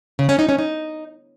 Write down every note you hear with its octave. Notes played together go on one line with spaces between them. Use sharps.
C#3
C#4
D#4
C#4
D#4